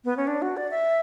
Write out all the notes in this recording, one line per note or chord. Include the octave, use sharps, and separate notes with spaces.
B3
C#4
D4
F#4
D5
E5